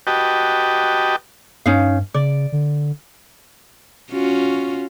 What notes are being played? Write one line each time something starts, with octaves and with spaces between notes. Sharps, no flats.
F#4 G4 B4 D#5 G5 A5
G2 C#4 D#4 F5
C#3 D5
D3
C#4 F4 F#4